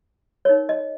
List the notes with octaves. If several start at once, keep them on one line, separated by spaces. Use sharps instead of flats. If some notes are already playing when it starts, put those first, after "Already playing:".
D#4 A#4 C#5
D#5